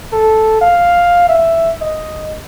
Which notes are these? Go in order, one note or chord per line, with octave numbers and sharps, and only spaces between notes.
A4
F5
E5
D#5